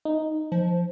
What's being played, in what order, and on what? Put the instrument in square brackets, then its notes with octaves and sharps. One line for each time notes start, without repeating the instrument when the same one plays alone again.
[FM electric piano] D#4
[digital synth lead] F3